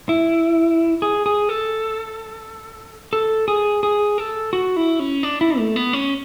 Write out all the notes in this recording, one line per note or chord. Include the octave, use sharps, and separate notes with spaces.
E4
G#4
G#4
A4
A4
G#4
G#4
A4
F#4
E4
C#4
D4
E4
A3
B3
C#4